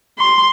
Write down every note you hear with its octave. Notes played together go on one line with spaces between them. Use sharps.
C6